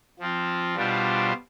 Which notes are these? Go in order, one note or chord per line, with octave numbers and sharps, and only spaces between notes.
F3 C4 F4
B2 G3 D4 F4 C5